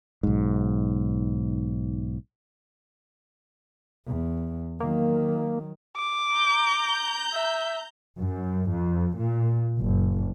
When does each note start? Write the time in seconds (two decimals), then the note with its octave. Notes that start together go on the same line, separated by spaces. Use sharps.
0.23 B1 G#2
4.06 E2
4.80 D#3 F#3 A#3
5.97 D6
6.34 A#5 G6
7.33 E5
8.18 F#2
8.70 F2
9.17 A#2
9.79 F#1